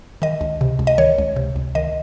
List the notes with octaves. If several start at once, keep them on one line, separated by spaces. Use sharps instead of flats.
D#3 D#5
C#2
C3
C#2
D#5
D#3 C#5
C#2
C3
C#2
D#3 D#5